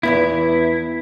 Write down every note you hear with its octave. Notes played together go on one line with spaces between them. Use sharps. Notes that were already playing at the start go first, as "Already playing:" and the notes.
E2 G2 B3 E4